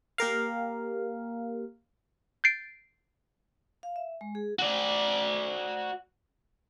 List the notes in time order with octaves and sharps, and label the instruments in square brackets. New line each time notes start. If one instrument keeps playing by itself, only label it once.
[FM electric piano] A#3 G4 A#4 F5
[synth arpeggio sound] G6 A6 C7 D7
[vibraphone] F5
E5
G#3
G#4
[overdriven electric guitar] F#4 D5